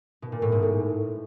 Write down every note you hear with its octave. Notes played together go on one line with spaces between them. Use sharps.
B2
A#2
A2
G#2
A2